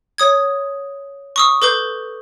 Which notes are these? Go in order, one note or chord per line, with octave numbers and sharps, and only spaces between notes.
C#5 D#6 G#6
C#6 D#6 E6
A4 B4 D6 G6